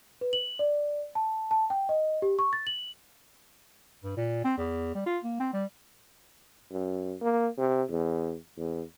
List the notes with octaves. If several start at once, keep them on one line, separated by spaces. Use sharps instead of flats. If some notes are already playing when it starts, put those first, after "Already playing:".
B4
F#7
D5
A5
A5
G5
D#5
G4
C#6
A6
F#7
G2
A#2
C4
E2
G3
F4
A#3
C4
G3
F#2
A#3
C3
E2
E2